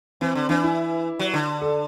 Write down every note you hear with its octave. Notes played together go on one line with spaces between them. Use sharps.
E3 C4
D3
E3 D4
E4
F#3
D3
A4